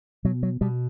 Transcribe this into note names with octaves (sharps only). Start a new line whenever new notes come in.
B2 F#3
F#3
B2 G3